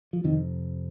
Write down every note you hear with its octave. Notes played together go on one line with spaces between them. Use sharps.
F3
F2 C3 D#3